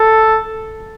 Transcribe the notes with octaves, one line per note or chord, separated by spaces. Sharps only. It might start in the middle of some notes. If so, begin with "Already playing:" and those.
Already playing: A4